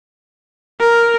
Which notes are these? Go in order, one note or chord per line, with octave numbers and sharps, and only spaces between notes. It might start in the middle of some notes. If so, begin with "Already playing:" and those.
A#4